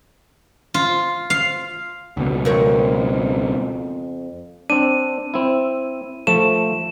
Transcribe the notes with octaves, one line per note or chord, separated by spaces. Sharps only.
F4
F5
C#2 B2
F2 A#4 C#5
C4 D4 D#7
C4 E4
F3 A3 E7